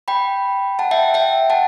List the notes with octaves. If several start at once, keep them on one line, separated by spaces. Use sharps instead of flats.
G5 B5
F#5 A5
E5 G5
E5 G5
F#5 A5